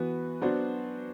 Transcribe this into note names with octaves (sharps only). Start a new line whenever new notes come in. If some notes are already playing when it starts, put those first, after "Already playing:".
Already playing: E3 B3 F#4 B4
F#3 B3 D4 F#4 C5